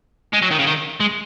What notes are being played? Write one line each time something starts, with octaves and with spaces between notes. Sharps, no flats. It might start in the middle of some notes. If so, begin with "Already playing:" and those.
G#3
F#3
D#3
C#3
D#3
G#3